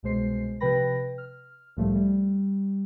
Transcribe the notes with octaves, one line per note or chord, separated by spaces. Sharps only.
C2 B2 G#3 C5 C7
C3 F3 B4 G5 B5 A#6
F6
C2 A2 F3 G3 A3
G3